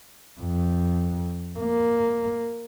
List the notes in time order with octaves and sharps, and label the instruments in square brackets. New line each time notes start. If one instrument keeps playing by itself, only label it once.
[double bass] F2
A#3